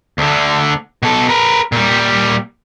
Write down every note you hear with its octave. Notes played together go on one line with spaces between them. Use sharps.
D2 D3
B2 A4
A#4 B4
A#2 G3